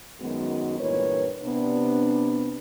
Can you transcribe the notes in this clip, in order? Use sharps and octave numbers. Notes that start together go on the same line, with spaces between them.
F#2 D#3 G#3 B3 D#4 F#4
G2 A#2 E3 A#4 B4 C#5
C3 B3 D4